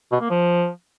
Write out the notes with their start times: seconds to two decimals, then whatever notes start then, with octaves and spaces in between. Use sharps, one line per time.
0.12 B2
0.21 A#3
0.30 F3